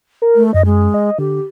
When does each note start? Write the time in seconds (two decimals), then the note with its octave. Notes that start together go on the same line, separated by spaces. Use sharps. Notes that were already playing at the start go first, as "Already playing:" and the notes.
0.22 A#4
0.36 A3
0.54 F#2 D#5
0.65 G#3
0.94 D#5
1.19 D3 G4